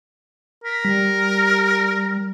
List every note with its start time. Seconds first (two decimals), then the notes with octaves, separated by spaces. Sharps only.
0.64 A#4 B6
0.85 G3